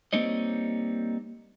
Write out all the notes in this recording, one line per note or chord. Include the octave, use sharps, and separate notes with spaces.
G3 A#3 C4 D#4 C#5 D#5